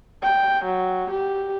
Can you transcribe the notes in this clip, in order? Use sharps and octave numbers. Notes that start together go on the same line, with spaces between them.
G5
F#3
G4